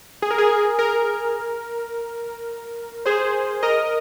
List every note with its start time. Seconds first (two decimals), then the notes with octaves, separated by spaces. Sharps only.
0.22 G#4
0.31 A#4
0.38 G#4
0.51 G#4
0.79 A#4
3.06 G#4 C5
3.63 A#4 D#5